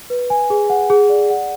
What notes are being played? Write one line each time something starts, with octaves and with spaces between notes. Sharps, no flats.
B4
G#5
G#4
F#5
G#4
D5
F#5